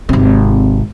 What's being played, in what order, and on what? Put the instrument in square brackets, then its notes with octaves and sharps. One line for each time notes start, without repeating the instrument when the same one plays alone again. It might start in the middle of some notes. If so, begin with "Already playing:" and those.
[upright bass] G#1 C3